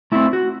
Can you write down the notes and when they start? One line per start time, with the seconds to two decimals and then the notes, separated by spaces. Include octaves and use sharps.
0.12 A3 C4 E4
0.33 F#4